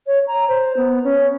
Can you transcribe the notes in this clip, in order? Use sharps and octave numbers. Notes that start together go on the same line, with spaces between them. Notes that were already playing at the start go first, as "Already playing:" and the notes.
C#5
A#5
C5
B3
C#4